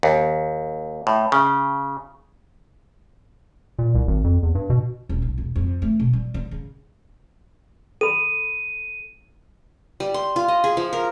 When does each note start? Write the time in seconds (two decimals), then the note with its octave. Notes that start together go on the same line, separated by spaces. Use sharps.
0.03 D#2
1.07 A2
1.32 C#3
3.79 A#2
3.95 C2
4.07 G#1
4.24 F2
4.43 E2
4.55 G2
4.70 B2
5.09 D#1
5.22 B1
5.38 E1
5.56 F2
5.82 A3
6.00 B2
6.13 G3
6.34 D3
6.51 C#3
8.01 A4 B5 D#7
10.00 G3
10.14 C6
10.36 F4
10.48 D#5
10.64 G#4
10.77 F3
10.93 A#4